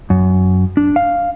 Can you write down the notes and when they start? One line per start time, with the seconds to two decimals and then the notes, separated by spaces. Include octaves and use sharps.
0.10 F#2
0.77 D4
0.96 F5